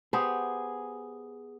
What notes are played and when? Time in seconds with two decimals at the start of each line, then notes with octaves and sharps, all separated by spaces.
0.13 B3 G4 G#4 C5